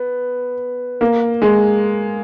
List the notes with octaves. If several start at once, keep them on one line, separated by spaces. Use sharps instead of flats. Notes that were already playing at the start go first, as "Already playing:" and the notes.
Already playing: B3
A#3
G#3